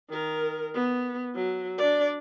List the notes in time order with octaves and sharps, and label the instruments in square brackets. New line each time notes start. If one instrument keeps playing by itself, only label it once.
[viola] D#3 A#4
B3
F#3
D4 D5